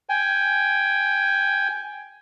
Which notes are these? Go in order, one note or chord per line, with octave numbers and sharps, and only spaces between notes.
G5 G#5